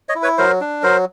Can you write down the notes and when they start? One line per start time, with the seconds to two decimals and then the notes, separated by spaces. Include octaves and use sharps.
0.09 C#5 D#5
0.15 E4
0.23 B4 C#5
0.38 F#3 A#4 C5
0.61 D4
0.83 F#3 A#4 C5